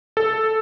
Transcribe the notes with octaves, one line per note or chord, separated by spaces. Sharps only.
A4